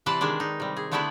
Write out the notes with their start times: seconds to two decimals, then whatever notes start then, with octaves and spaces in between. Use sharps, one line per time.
0.06 C3 E3 B4 C5 D5 A5
0.21 D#3 G#3 D4
0.40 D#4
0.60 C3 G3
0.77 G#4
0.92 D3 A3 B3 D4 E4 B4